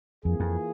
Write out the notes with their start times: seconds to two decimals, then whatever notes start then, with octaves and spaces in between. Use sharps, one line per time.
0.25 F2 E3 A#3 F4 G#4
0.40 F2